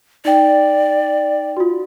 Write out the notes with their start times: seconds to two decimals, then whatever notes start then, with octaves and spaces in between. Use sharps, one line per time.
0.25 D#4 D5 G5
1.57 F4 F#4